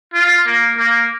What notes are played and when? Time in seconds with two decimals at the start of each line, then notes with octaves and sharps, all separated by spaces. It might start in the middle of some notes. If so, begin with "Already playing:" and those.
0.14 F4
0.46 A#3
0.78 A#3